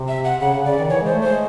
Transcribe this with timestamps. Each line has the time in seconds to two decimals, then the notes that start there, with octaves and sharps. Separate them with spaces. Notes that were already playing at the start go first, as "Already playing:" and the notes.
Already playing: C3
0.08 E5
0.24 F#5
0.40 C#3 F#5
0.53 C#3
0.65 C#3 D5
0.78 D#3
0.89 E3 C#5
1.01 G#3 C5
1.13 A3
1.22 G#3 C5